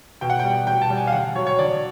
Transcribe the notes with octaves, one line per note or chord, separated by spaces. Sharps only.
B2 G5
F#5
G5
G3
B2 G5
A5
G3
G#5
F5
D3 F#5
F#3 C#5
C#5
D3 D5